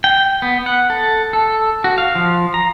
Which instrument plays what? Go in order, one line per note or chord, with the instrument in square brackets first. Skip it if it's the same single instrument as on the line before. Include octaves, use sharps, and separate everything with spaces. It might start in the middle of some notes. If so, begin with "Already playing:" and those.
[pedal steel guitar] G5
B3
F#5
A4
A4
F#4
F5
F3
A#5